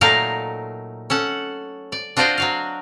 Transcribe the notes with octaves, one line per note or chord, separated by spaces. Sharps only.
A#2 F#3 A3 D#4 A#4 F5
C#4 A4 F#5
D5
D4 F4 F#4 C5 D5 D#5
F#3 F#4 F5